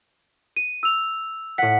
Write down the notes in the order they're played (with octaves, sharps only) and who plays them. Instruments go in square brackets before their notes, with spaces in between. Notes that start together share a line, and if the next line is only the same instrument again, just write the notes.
[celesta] D#7
E6 F7
[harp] A2 F#5 [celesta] B6